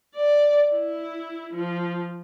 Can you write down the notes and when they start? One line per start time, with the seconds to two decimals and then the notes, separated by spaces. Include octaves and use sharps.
0.16 D5
0.75 E4
1.54 F3